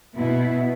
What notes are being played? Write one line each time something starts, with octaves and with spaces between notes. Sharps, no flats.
B2 B3 E4